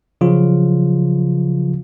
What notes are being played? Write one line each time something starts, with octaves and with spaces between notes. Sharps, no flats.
C#3 F3 F#3 F4